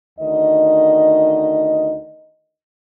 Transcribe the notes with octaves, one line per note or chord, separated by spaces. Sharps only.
D2 D#3 D#5